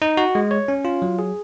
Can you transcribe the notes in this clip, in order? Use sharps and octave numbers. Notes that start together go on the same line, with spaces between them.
D#4
F#4
G#3
C#5
C#4
F4
F#3
G#4